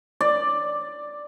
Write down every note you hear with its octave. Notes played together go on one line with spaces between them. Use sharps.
D5